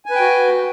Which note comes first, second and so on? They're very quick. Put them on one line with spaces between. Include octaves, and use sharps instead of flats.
G#5 B4 G5 F#4